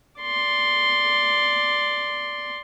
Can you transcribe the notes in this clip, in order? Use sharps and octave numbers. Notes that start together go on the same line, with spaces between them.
D5 C6